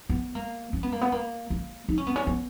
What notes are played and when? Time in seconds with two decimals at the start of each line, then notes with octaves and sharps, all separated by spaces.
0.09 B3
0.35 A#3
0.73 C#4
0.83 B3
0.92 A#3
1.01 B3
1.12 A#3
1.50 A#3
1.89 D#4
1.98 C#4
2.07 B3
2.16 C#4
2.27 B3